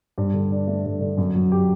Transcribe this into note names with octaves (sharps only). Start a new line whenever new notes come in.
G2
D3
D4
A3
G2
D3
F#2
F#3
G4